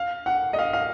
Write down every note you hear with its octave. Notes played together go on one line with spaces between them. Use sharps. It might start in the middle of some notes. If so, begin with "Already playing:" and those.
Already playing: F5
F#5
D#5
F5
F5